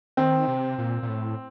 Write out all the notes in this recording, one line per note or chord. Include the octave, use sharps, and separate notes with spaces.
D#3 C4
C3
A#2
A#2
A2